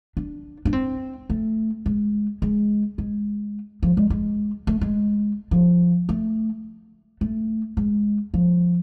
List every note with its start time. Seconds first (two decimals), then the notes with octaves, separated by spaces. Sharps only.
0.17 D4
0.65 D4
0.73 C4
1.30 A3
1.86 G#3
2.42 G#3
2.98 G#3
3.83 F3
3.97 G#3
4.10 G#3
4.67 A3
4.81 G#3
5.51 F3
6.09 A3
7.21 A3
7.77 G#3
8.34 F3